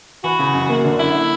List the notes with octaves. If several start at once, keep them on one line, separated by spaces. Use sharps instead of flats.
E3 F#4
C#3
F#2
A#3
D3
F#2 E4